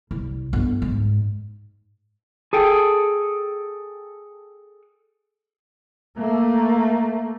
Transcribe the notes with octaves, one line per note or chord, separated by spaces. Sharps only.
C2
G1
G#2
G#4 A4 G5
A3 A#3